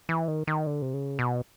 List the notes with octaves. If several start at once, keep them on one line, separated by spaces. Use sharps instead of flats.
E3
D#3
D#3
D3
C3
C#3
B2